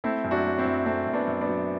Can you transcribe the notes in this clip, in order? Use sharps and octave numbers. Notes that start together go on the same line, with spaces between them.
A3 C4 E4
F#2
D4 F#4
F#3
C4 E4
F#2
A3 C4
F#2
B3 D4
F#2
B3 D4
F#3